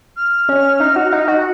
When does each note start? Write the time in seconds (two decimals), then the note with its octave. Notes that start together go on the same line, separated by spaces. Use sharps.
0.16 F6
0.49 C#4
0.80 D#4
0.96 F#4
1.12 D#4
1.28 F#4